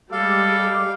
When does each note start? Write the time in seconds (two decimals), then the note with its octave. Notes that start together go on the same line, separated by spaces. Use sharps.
0.12 G3 G#3 A4 F5 D6